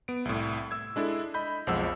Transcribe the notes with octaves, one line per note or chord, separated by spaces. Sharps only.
B3 D7
C2 A2
E6 G#6
G#3 D4 E4 A4
D#5 B5 G6
B1 F2 F3 G#3 F#5 E6